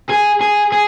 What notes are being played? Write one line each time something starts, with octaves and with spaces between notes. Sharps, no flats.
G#4
G#4
G#4